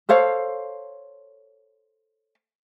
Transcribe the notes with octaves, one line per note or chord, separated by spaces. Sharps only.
A4 C5 C#5 F5